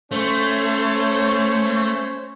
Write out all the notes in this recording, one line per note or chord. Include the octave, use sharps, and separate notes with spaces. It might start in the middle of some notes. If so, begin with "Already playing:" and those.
A3 C#4 C5 C#5